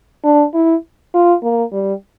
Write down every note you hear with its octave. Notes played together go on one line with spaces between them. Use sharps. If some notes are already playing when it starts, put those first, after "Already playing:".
D4
E4
F4
A#3
G3